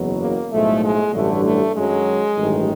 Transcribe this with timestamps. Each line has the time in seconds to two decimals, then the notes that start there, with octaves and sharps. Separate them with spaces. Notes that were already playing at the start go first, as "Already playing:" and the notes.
Already playing: F#1 E2 B2 F#3
0.20 A#3
0.51 B1 A2 F3 G#3 A3
0.81 G#3
1.13 A1 G2 D3 F#3 A3
1.45 A3
1.75 F#2 D#3 F#3 G#3
2.37 A1 G2 D#3